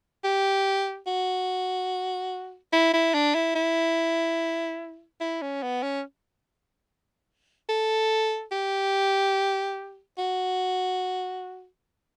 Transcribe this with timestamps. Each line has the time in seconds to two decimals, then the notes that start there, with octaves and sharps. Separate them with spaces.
0.24 G4
1.07 F#4
2.73 E4
2.93 E4
3.14 D4
3.35 E4
3.55 E4
5.20 E4
5.42 C#4
5.63 B3
5.83 C#4
7.69 A4
8.52 G4
10.18 F#4